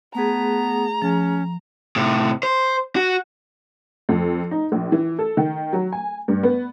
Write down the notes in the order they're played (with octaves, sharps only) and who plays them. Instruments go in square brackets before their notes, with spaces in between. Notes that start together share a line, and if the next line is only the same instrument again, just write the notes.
[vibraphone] A3 G#4 [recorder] B3 [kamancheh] A#5
[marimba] F3 [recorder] C#4
[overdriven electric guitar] A2 C3
C5
F#4
[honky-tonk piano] F2
D#4
A#1
E3
A4
D#3
F#3
G#5
G2
B3